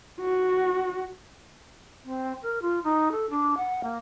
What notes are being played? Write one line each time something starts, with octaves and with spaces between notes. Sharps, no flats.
F#4
C4
A#4
F4
D#4
A4
D4
F#5
A#3